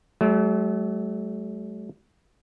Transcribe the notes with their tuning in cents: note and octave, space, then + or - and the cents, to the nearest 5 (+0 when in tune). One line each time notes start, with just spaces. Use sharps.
F#3 +35 A3 -40